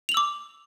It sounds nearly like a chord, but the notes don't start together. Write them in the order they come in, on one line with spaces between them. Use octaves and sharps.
F7 F#7 E6 D6